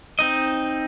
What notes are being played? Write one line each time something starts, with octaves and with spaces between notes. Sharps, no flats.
C4 D#4 D#5